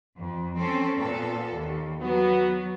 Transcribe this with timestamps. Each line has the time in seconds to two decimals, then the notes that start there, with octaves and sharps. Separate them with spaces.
0.18 F2
0.58 C4 C#4 A4
0.98 A#2 B3 A4
1.55 D#2
2.01 F#3 B3 F#4